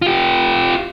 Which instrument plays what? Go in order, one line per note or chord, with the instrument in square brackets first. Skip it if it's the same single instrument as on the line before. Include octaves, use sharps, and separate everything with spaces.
[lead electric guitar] F4 G4